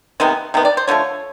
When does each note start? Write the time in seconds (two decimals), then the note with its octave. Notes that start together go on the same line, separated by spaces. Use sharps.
0.20 C3 D#3 G#3 B3
0.54 C3 D#3 B3
0.65 D5
0.77 C5
0.88 D3 F3 A3 C#5